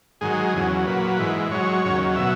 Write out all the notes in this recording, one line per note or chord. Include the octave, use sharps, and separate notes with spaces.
G#2 D#3 F#3 G#4
E2 C#3 F#3
A#2 F#3 B4
G#2 E3
G#2 F#3 C#5
D#2 C#3 F#3
B2 F#3 E5